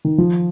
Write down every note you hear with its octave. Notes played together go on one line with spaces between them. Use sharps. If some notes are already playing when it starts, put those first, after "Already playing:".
D#3
F3